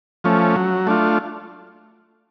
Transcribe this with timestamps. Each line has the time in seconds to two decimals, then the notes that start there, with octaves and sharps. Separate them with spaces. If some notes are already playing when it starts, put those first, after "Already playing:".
0.24 F3 A3 C#4
0.56 F#3
0.87 A3 D4 F4